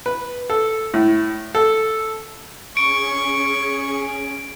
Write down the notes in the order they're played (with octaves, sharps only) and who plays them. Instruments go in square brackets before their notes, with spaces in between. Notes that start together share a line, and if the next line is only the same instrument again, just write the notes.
[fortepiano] B4
A4
A2
A4
[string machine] C#4 G#4 [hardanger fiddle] C#6 [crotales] D7